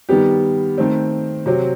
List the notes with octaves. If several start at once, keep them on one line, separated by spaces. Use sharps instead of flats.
D#3 G3 B3 G4
D#3 A3 C4
C3 F#3 C4